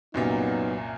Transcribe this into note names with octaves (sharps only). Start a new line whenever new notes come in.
C2 F#2 A#2 F#3 B3 D#4